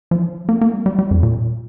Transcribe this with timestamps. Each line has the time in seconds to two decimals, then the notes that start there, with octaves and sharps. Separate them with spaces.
0.11 F3
0.49 A#3
0.61 A#3
0.73 G3
0.86 G3
0.99 G3
1.11 F2
1.23 A#2